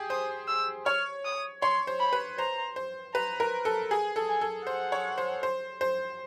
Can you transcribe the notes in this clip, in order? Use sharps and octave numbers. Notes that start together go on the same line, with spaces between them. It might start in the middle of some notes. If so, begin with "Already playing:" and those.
Already playing: G4 G#4
C5 D#6
E6
C#5 F6
D#6
C#5 C6
C5
B5
B4
C5 A#5
C5
B4 A#5
A#4
A4
G#4 G#5
A4
G#5
A4
C5 F#5
C#5
C5
C5
C5